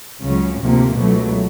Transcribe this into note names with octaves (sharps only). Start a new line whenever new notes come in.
C#2 C#3 F#3
D2 C3 F3 A#3
C#2 B2 F#3 A3